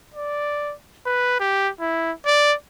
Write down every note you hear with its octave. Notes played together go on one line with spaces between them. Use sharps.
D5
B4
G4
E4
D5